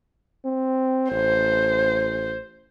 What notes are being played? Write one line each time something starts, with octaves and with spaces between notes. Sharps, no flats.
C4
A1 C5